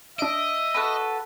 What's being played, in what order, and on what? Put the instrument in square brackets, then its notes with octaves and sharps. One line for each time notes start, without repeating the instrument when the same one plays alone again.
[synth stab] D4 D7 [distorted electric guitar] D#5 [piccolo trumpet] E5
[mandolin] F#4 A4 B4